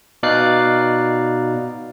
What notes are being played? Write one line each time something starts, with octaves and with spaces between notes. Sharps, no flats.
B2 D#4 D5 F5 F#6 C7